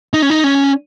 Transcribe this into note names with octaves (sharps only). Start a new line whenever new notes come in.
D#4
C#4
D#4
C#4